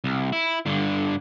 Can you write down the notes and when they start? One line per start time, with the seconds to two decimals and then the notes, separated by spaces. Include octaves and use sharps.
0.04 C2
0.33 E4
0.66 G2 D3